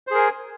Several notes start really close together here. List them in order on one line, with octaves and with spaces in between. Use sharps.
C5 G#4 A#4 G#5